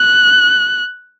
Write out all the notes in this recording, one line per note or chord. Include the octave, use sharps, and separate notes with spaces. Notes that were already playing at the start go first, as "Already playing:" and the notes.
Already playing: F#6